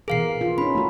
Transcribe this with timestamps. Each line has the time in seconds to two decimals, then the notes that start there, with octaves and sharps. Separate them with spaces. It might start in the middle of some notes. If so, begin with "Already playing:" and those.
0.08 B2 E3 G#4 A#4 F5 C7
0.41 F4
0.58 C#4 D#4 B5
0.75 A3 F#4